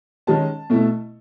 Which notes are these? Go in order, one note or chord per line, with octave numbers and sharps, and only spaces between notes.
D#3 G#3 C#4 A5
B2 A3 E4